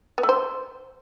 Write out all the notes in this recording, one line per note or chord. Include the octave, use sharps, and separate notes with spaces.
B3
A3
C5